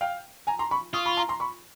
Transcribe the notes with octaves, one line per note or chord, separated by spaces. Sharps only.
F5 G5
G#5 A#5
A#5 C6
B5 C#6
F4 C#6 D#6
B5 C#6
A#5 C6
A#5 C6
B5 C#6